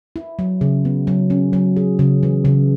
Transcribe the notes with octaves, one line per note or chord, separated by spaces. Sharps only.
E4
F#3
C#3
B3
F#3
C#4
F#3
G#4
C#3
E3
C#3